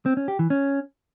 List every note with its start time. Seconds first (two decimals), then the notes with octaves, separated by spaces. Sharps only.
0.06 C4
0.17 C#4
0.28 G4
0.39 E3
0.50 C#4